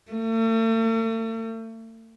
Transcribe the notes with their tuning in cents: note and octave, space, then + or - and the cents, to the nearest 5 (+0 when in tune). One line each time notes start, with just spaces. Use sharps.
A3 +45